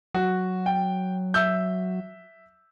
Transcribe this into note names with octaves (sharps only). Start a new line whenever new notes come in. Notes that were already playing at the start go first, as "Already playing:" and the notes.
F#3 F#4
G5
E5 E6 G6